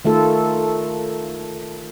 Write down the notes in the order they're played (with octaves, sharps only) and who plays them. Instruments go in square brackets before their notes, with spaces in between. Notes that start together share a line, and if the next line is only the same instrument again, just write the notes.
[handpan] D#3 A3 F4 A4